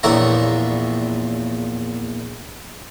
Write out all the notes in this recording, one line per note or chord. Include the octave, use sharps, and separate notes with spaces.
A#1 E2 D4 C#5 E5 A#5